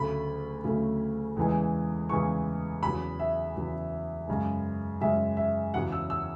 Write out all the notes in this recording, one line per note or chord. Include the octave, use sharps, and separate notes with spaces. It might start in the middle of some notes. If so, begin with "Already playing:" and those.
Already playing: D2 C#3 F#3 A3 B5
D2 C#3 F#3 A3
E2 C#3 E3 G#3
E2 C#3 E3 G#3 C#6
E2 C#3 F#3 B5
E5
E2 C#3 F#3
F#2 C#3 G#3
F#2 C#3 G#3 E5
E5
E2 C#3 F#3 F#5
E6
E6